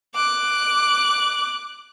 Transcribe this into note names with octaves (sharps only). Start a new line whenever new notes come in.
D6 F#6